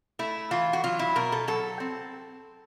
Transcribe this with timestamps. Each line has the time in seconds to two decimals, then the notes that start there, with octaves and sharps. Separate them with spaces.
0.19 A3 E4
0.51 E3 F4
0.73 F#4
0.84 F#3 F4
0.99 E4
1.16 B2 A#4
1.32 A4
1.48 F#3 A4
1.80 C4